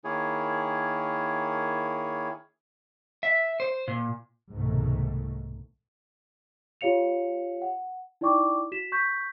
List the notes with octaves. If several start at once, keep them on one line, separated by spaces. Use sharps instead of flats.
D#3 A#3 E4 G#4 C#5
E5
C5
A#2
C2 G#2 B2 D#3 G#3 A3
F4 G4 C#5 F5 C#7 F7
F#5
D#4 E4 D5 G5 C#6 D6
F#4 B6 E7
C#6 G6 B6